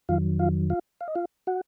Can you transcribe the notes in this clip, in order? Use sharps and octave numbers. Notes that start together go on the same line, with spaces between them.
F2 D#3 F#3 F4 F5
F4 F5
F4 F5
F5
D#5
F4 F5
F#4 F#5